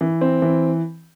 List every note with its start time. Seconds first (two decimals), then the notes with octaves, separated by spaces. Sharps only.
0.01 E3
0.21 C4
0.42 E3